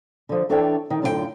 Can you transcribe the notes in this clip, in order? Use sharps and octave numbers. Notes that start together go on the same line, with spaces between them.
D3 F3
E3 D4 A4 C#5 D5 G5
D#3
F#2 A2 D3 F4 G4 G5